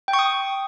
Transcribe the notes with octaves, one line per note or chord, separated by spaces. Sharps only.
G5
C#6
D#6